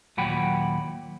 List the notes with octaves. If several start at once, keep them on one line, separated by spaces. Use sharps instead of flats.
D#2 A#2 F#3 F#5 G5 B5